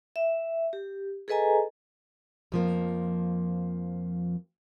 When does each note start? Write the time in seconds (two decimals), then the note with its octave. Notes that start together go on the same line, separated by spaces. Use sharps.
0.16 E5
0.73 G4
1.28 G#4 A4 B4 D#5 G#5 A#5
2.52 F2 F3 A#3